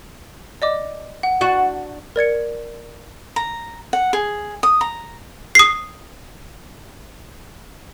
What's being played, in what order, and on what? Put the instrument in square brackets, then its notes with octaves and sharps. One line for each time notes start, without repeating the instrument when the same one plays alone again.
[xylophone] D5 D#5 D6
F#5
[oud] D4 F#4
[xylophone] A#4 D5 G#6 C#7
[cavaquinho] A#5
F#5
G#4
D#6
A#5
[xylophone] D#6 C7